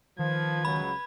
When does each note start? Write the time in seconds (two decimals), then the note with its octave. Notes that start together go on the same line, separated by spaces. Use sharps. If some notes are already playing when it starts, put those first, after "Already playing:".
0.19 D#3 F3 B4 G#6
0.65 C#2 C#3 F#3 B5